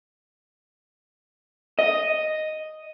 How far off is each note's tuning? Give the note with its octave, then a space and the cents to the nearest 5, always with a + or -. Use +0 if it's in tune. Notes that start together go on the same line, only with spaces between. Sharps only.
D#5 +0